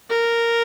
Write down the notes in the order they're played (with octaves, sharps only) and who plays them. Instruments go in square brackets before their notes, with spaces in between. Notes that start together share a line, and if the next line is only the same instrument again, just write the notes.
[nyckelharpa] A#4